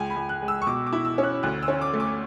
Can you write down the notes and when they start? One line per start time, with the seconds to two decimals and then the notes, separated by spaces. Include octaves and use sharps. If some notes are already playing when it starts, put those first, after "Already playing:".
Already playing: C#2 G#5
0.10 B5
0.16 C#2
0.29 F#6
0.42 G#3
0.48 E6
0.62 C#6
0.67 B2 D6
0.87 D6
0.93 E4
1.05 E6
1.18 C#4
1.24 F#6
1.43 D2 F#6
1.63 E6
1.68 C#4
1.81 D6
1.94 A3
2.00 D6